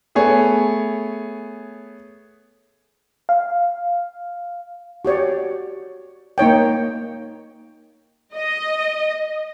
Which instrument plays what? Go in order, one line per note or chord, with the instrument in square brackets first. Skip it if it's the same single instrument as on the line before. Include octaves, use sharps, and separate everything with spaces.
[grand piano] A3 B3 G#4 C#5
[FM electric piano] F5
[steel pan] F#4 G4 C#5 D5
A#3 D#4 C#5 G5
[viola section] D#5